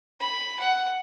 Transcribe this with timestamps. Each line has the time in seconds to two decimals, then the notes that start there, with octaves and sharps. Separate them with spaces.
0.20 B5
0.59 F#5